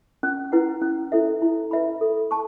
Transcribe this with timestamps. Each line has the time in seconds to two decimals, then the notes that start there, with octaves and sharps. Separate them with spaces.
0.23 C#4
0.52 E4 B4 F#5
0.81 C#4
1.12 E4 A4 E5
1.42 E4
1.71 B4 E5 B5
2.01 A4
2.31 A5 C#6